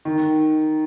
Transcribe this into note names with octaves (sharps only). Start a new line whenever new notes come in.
D#3